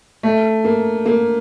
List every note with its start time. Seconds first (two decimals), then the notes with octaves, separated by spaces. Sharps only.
0.23 A3
0.64 A#3
1.05 A#3